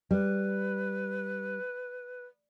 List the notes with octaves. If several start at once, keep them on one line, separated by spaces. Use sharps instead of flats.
G3 B4